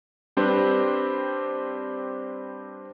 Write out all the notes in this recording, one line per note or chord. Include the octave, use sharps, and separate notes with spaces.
G3 C4 D4 G4 B4 C5